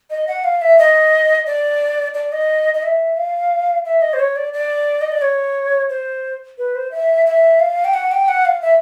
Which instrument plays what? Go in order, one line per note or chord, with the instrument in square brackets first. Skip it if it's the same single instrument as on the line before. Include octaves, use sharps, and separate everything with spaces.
[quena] D#5
F#5
F5
E5
D#5
D5
D5
D#5
D#5
E5
F5
E5
D#5
C5
C#5
D5
D5
D#5
D5
C#5
C5
B4
C5
E5
E5
F5
G5
F#5
G5
F#5
F5
E5